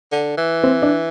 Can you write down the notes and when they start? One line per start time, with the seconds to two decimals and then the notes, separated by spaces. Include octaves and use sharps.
0.12 D3
0.37 E3
0.64 C4
0.82 D4